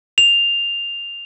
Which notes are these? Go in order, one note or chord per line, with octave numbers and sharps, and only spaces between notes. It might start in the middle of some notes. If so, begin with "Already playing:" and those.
F7